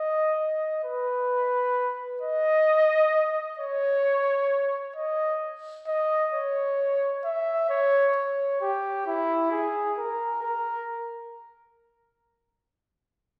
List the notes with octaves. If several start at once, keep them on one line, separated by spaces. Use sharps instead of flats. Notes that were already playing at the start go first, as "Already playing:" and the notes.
Already playing: D#5
D#5
B4
D#5
C#5
D#5
D#5
C#5
E5
C#5
C#5
G4
E4
G#4
A#4
A#4